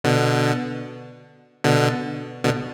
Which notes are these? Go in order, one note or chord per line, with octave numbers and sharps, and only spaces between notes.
B2 D3
B2 D3
B2 D3